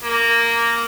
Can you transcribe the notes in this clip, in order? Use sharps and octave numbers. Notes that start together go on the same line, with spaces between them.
A#3